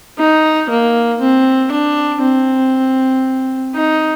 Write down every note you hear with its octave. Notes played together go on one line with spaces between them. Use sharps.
D#4
A#3
C4
D4
C4
D#4